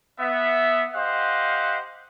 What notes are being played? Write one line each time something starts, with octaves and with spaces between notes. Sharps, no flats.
B3 E5
G4 C5 D#5 F5 F#5